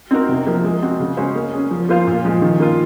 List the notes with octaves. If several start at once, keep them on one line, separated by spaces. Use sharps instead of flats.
C4 D#4 F#4 A#4
C3
F3 A#3
G#3
C4 F#4
C#3
G#3 C#4 F#4 C5
A#3
C#4 G#4
F3
A#3 F4 C5 F5
A#2
F3 G#3
D#3
A#3 F4